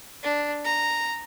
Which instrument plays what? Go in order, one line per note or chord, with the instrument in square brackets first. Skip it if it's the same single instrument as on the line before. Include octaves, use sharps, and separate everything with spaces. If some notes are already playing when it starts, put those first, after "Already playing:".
[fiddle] D4
A#5